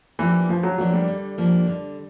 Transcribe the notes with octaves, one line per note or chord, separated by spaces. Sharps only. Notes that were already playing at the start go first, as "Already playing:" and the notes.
E3 F3 A#3 D4 G4
D3 F3
F#3
F3 F#3 A#3 D4 G4
G3
D3
F3 A#3 D4 G4
D3